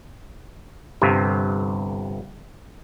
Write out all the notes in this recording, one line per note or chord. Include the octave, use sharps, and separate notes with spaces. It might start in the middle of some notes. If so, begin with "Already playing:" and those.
G1 G2 C3